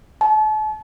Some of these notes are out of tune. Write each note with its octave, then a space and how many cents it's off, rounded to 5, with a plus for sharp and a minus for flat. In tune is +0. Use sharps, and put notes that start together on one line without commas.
A5 -40